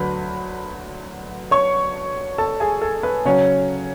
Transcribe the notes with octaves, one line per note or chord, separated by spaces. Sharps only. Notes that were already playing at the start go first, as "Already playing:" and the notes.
Already playing: D2 D3 F#3 B4 B5
C#5 C#6
A4 A5
G#4 G#5
A4
B4
C#3 F#3 C#4 C#5